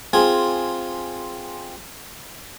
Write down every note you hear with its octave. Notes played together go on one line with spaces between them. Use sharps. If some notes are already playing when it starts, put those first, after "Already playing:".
C4 F4 G#4 G#5